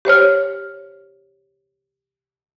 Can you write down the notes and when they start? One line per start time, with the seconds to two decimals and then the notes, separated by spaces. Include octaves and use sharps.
0.05 G4 C5 C#5 F6